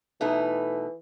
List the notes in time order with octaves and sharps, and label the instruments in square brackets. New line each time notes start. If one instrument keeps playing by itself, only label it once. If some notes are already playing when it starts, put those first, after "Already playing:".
[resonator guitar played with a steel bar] B2 A3 D#4 [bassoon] E3